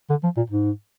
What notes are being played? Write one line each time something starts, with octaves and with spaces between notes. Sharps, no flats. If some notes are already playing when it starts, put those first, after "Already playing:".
D3
F3
A#2
G#2